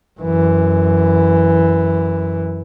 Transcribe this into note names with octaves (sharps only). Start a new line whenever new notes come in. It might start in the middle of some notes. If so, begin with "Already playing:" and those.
F#2 E3